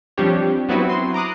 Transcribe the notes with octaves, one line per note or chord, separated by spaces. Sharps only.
F3 G3 C4 D4 G4 C#5
F#3 B3 C4 E4 F#4 B4
C6
A#5 D6 D#6 F#6